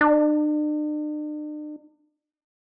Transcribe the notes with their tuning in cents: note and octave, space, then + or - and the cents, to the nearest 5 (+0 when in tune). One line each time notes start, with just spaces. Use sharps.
D4 +45